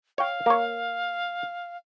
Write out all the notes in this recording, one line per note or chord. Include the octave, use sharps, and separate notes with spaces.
C#5 F5 G5
A#3 C#5